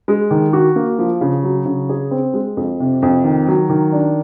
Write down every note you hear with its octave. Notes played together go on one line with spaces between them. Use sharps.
G#3
D#3
F#4
A#3
F3
C#3
F#3
C#3
G#4
C4
G#3
F2
C3
F2
D#3
F#3
D#3
D4